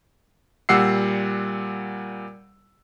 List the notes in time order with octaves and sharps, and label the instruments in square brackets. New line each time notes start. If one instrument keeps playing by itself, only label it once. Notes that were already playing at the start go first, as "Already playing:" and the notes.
[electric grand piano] A#2 G3 F#5 E6 C7